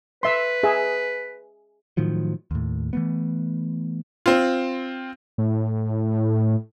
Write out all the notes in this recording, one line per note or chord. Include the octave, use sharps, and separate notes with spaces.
B4 E5 C6
G#4 E5
A2 D#3 F3 F#3
D#2 A2
E3 A3 B3
C4 F4
A2